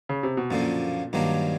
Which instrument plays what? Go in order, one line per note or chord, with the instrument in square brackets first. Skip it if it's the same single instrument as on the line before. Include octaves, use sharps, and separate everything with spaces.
[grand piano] C#3
C3
B2
[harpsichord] F#2 D3 F3 A#3 [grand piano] A#2
[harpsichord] G2 D#3 F#3 A#3 D4